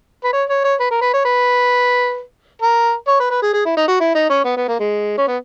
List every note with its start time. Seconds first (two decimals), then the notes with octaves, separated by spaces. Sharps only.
0.24 B4
0.33 C#5
0.49 C#5
0.64 C#5
0.80 B4
0.90 A#4
1.01 B4
1.13 C#5
1.25 B4
2.62 A#4
3.07 C#5
3.20 B4
3.30 B4
3.42 G#4
3.54 G#4
3.65 E4
3.77 D#4
3.88 F#4
4.00 E4
4.14 D#4
4.30 C#4
4.45 B3
4.57 B3
4.68 A#3
4.80 G#3
5.17 C#4
5.27 B3